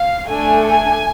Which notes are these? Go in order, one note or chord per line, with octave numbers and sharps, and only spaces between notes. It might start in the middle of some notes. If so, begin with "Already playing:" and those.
Already playing: F5
A3 D4 A4 G#5
G#5